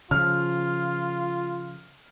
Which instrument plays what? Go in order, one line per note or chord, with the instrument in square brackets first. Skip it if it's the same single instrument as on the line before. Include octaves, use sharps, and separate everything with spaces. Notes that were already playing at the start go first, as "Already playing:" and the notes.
[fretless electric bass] C#3 F3 [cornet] F4 [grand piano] F6